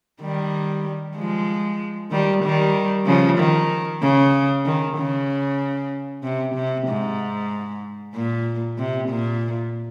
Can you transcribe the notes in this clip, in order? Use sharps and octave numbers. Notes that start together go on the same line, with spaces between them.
D#3 G3
F3 G#3
D#3 G3
D#3 G3
C#3 F3
D#3
C#3
D#3
C#3
C3
C3
G#2
A#2
C3
A#2